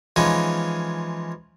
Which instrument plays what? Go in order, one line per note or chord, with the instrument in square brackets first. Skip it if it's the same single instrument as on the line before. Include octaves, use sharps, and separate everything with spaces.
[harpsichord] E3 F3 G#3 C#4 D#4 F4